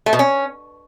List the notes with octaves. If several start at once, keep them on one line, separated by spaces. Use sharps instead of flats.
A3
B2
C#4